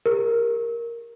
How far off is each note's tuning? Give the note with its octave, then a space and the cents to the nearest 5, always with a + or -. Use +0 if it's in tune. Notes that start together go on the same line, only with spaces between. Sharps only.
G4 +40 A#4 +0